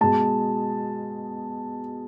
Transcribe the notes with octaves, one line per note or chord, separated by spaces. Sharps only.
B2 G#3 A5